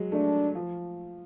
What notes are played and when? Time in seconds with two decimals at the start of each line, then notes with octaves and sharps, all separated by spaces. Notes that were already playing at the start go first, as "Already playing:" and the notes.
Already playing: F#3 G#3
0.12 A3 D4
0.55 F3